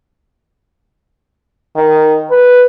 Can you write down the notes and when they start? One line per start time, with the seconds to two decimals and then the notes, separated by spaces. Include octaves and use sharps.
1.76 D#3
2.31 B4